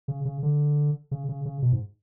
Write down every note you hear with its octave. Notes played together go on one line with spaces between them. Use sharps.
C#3
C#3
D3
C#3
C#3
C#3
B2
G#2